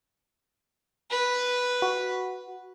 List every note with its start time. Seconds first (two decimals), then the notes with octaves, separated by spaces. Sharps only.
1.10 B4
1.82 F#4